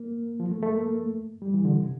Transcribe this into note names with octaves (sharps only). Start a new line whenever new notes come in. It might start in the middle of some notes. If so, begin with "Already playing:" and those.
Already playing: A#3
F3
A3
A3
A#3
G3
E3
D3
C3